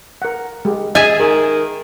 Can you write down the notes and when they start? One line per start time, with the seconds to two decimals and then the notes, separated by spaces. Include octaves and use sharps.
0.22 A#4 F#5
0.65 G#3 G4
0.95 G#4 D#5 E5 G#5
1.20 D#3 G#4